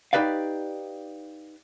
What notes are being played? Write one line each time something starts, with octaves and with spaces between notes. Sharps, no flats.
D#4 G4 B4 D5 F5